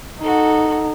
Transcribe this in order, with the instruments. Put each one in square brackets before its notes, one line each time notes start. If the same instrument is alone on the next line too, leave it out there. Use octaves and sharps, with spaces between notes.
[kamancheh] D#4 [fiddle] F#4 A4